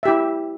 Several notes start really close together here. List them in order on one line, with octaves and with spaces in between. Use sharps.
E5 G4 E4